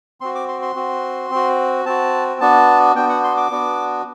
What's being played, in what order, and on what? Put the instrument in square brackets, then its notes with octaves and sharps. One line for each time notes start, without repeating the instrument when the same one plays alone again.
[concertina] C4 F#4 C6
D6
C6
C6
C4 F#4
C4 F#4
C4 F#4 A5
B3 D4 F#4 A5
B3 D4 F#4 G5
F#5
C6
D6
B3 D4 F#4